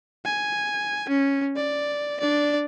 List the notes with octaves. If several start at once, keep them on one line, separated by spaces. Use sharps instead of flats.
G#5
C#4
D5
D4 D5